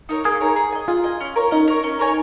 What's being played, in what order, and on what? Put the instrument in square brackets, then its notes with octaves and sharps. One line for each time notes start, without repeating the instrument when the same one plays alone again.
[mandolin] D#4 A#4 C#5
[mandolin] A#3 [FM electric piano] G#4
[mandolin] D#4 A#4 C#5
G#4
D#5 G#5
[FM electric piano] F4 [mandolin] G#4
[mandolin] D#5 G#5
C#4
A#4 C#5
[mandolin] C#4 [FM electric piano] D#4
[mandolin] A#4 C#5
C#4
A#4 C#5 G#5